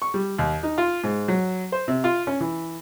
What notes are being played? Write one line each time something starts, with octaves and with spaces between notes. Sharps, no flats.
C#6
G3
D#2
D#4
F4
G#2
F#3
C5
C3
F4
C#4
E3